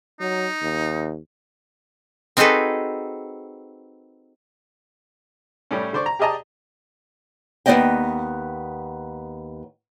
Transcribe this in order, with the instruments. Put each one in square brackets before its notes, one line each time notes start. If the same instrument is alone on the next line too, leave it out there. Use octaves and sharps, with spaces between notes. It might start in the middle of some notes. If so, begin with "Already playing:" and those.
[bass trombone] F#3 [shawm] D#4
[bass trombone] D#2
[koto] C4 D#4 F#4 G#4 A4 B4
[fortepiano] A2 G3 C#4
D3 C5 D5 C#6
A#5
G4 G#4 D5 D#5 A5 A#5
[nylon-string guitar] D#2 F#3 B3 D5 D#5 G5